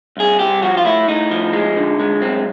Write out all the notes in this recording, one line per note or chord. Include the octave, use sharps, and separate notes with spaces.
C2 G#4
C2 G4
F3 F#4
F4
A2 E4
A2 D#4
F3
G#3
D3
G#3
F#2 C4